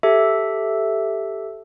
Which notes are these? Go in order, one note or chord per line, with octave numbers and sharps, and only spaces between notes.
G4 A4 E5